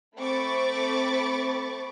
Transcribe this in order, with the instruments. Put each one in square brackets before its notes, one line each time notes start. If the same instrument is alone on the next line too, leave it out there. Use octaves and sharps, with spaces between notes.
[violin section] A3 C4 B5 C#6 D6 A6